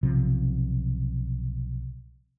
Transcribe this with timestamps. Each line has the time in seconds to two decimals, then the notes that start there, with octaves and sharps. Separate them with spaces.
0.03 B1 C3 F3